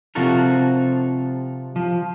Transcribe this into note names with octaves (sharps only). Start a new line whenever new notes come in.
C3 F3 F4 F#4 A4 A#4
F3